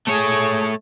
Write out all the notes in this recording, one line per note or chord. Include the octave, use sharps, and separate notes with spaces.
A3 G#4 C#5